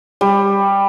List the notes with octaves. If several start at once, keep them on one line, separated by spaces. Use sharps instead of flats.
G3